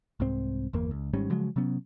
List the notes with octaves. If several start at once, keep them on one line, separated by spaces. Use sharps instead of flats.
C2 G#2 C4
G1 E2 A#3
C#2
G#1 G#2 G3 C#4
C#3 F3 F#3 G#3
C3 F#3 B3 C#4